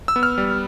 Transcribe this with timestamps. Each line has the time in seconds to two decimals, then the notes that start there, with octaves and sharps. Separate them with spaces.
0.08 E6
0.16 B3
0.23 F6
0.38 G3